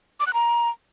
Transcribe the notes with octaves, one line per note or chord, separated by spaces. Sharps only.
D6
F#6
A#5